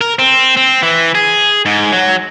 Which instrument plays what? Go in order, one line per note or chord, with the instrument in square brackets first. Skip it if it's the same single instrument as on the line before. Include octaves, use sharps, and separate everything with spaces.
[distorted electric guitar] A#4
C4
C4
E3
G#4
G#2
F#3